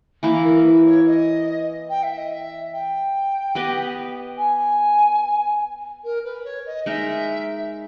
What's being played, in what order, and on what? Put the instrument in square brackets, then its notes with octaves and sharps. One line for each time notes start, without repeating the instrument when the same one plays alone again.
[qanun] E3 A#3 E4
[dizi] A#4
B4
C#5
D#5
G5
E5
D#5
E5
G5
[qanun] B3 G4 B4 D#5
[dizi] G#5
A#4
B4
C#5
D#5
[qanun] G#3 D#4 A#4 [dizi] E5